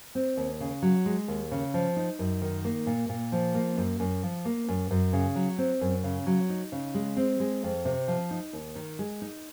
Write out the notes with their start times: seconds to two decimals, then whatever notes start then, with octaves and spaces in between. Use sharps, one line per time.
0.15 C4
0.37 D#2
0.60 C#3
0.82 F#3
1.06 G#3
1.28 D#2
1.52 C#3
1.74 F3
1.96 D#4
2.19 F#2
2.42 D#3
2.65 A#3
2.86 A#2
3.09 A#2
3.32 F3
3.54 A#3
3.77 F#2
4.00 F#2
4.23 F3
4.45 A#3
4.68 F#2
4.91 F#2
5.13 C#3
5.36 F#3
5.58 C4
5.81 F#2
6.04 C#3
6.26 F#3
6.50 D#4
6.72 C#3
6.95 G#3
7.17 C4
7.40 G#3
7.63 F2
7.85 C3
8.08 F3
8.31 D#4
8.53 D#2
8.76 D#3
8.99 G#3
9.22 D#4